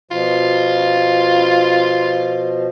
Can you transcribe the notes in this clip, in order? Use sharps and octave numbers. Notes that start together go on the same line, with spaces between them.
B2 F3 F4